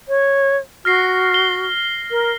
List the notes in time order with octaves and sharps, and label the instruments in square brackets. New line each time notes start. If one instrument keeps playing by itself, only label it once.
[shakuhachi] C#5
[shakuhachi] F#4 [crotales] F6 A#6 C7
[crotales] G7
[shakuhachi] A#4